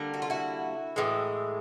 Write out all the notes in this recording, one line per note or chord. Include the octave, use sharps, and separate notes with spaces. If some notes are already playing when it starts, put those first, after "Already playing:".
Already playing: D3 G3 A#3
F#4
F4
E4 F#4
A2 E3 G#3